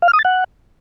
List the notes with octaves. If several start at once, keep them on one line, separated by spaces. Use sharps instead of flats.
F5
F6
D#6
A6
F#5